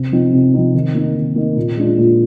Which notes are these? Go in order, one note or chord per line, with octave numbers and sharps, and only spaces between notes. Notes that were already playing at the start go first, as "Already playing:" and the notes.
Already playing: C3
F3 C4 D#4
C3
F3 C4 D#4
D#3
A#3 D#4
D#3
A#3 D#4
A#2
G#3 D4 F4
A#2